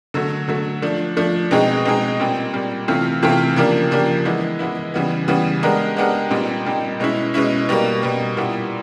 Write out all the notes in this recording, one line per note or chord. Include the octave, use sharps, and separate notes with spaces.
D3 F#3 A3
D3 F#3 A3
F3 A3 D4
F3 A3 D4
B2 G#3 C4 D#4 G#4
B2 G#3 C4 D#4 G#4
A#2 G3 C4
A#2 G3 C4
C3 E3 A3 C4 F4
C3 E3 A3 C4 F4
C#3 F3 A#3 D4 G4
C#3 F3 A#3 D4 G4
E3 G#3 B3 E4
E3 G#3 B3 E4
C#3 E3 G3 B3
C#3 E3 G3 B3
G#3 B3 D4 G4 A#4
G#3 B3 D4 G4 A#4
A#2 G3 C4 D#4 G4
A#2 G3 C4 D#4 G4
B2 G#3 C#4 E4
B2 G#3 C#4 E4
B2 G3 A#3
B2 G3 A#3
A#2 G3 B3 E4